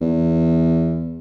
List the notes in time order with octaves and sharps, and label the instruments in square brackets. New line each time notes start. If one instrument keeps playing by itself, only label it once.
[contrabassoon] E2